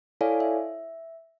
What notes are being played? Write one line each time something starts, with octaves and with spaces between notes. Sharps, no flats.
E4 A4 C#5 D5 F5 G#5
E5